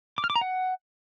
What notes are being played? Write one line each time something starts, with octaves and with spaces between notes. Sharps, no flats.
D6
F6
D6
A#5
F#5